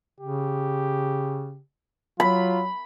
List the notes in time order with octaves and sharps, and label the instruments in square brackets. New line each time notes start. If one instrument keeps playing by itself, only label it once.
[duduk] C#3 [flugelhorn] G4
[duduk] F#3 [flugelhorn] F4 [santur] B5